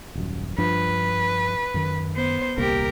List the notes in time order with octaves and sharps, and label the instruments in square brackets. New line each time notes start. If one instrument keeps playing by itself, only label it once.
[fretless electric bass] D#1 F#2
[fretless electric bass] G2 F3 D4 [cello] B4
[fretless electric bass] F#2 D#3
[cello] B3 C5
[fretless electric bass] D#1 C2 A#3 [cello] G4 A#4